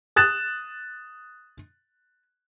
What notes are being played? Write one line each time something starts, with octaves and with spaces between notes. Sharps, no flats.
D#6 F#6 A6 E7